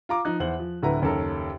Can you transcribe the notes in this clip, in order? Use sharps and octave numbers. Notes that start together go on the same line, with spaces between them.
F4 A#5 D6
F3 D#4 F#6
E2 C5 F#5 F#7
F3
D1 D3 E4 B4 F#5 A#5
F#1 D#2 C#4 A4 A#4